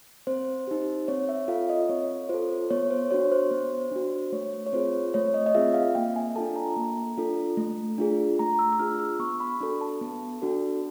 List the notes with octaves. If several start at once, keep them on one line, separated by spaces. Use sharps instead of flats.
C4 C5
D#4 G4
C4 C#5
E5
F4 A4 F5
D#5
C4 C#5
F4 A4 C5
B3 C#5
C5
D4 F#4 C#5
C5
B3
D4 F#4
A3 C#5
C#5
C4 F4 G#4 C5
A3 C#5
D#5
D#5
C4 F4 G#4 E5
F5
A#3 G5
G#5
D4 F4 A4 A5
A#5
A#3
D4 F4 A4
A3
D4 F4 G#4
A3 A#5
E6
E6
D4 F4 G#4 F6
E6
B3 C#6
B5
D4 F#4 A4
A5
B3
D4 F#4 A4